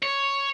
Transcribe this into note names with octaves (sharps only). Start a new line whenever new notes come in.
C#5